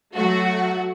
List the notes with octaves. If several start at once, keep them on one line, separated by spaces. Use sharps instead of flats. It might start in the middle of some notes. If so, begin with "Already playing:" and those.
F#3 A3 F#4